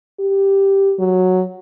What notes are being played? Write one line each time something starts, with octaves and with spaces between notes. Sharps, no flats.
G4
F#3